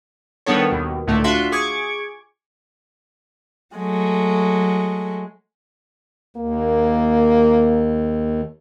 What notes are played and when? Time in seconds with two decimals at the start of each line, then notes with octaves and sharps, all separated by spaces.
0.46 D#3 G3 B3 D4 A4 C#5
0.70 D#2 B2 D#3
1.07 C#2 A2 D3 A3
1.24 D4 F4 F#4 E5 C6
1.52 G#4 C#6 D6 G#6
3.75 F#3 G#3 A3
6.37 D#2 A#3